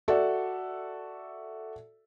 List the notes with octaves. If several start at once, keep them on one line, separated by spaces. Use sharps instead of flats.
F#4 A4 D5 E5